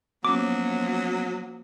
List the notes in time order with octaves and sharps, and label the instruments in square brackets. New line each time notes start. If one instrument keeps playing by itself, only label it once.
[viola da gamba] F3 A#3 [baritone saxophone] F#3 [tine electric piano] B3 C#4 [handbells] D6